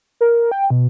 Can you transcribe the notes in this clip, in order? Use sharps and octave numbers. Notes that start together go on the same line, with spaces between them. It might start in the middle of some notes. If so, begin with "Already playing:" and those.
A#4
G5
B2